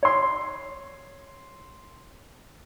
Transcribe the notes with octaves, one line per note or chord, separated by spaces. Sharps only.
C#5 C6